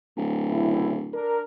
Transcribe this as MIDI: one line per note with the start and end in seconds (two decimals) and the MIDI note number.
0.17 1.16 26
0.49 0.98 35
0.49 0.98 49
0.49 0.98 64
1.13 1.41 62
1.13 1.41 70